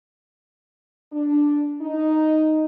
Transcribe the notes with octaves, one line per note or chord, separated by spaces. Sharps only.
D4
D#4